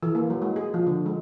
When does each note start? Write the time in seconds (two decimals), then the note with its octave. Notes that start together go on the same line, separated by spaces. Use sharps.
0.03 E3
0.15 A#3
0.30 F#3
0.42 G#3
0.56 G#4
0.74 F3
0.87 D3
1.06 G#3